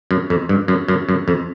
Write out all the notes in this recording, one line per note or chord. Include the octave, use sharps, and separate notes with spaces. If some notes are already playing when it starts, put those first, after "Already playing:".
F#2
F2
G2
F#2
F#2
F#2
F2